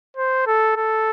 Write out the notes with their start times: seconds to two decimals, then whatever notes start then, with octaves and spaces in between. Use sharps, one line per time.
0.17 C5
0.47 A4
0.77 A4